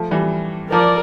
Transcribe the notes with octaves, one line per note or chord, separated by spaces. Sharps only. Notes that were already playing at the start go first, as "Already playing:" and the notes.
Already playing: F3 A3
E3 G3
F3 A#4 D5